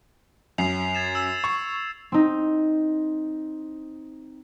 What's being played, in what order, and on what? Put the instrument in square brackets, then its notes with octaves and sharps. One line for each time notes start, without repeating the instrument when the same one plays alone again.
[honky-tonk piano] F#2 [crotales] C7 F7
[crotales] G#6 A6 E7
E6 E7
[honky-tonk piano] C#6
[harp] C4 D#4